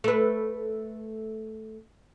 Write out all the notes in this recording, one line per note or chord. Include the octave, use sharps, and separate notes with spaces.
A3 B4